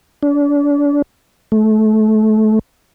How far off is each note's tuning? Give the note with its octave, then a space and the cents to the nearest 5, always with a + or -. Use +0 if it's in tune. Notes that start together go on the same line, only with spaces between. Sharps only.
D4 -35
A3 -25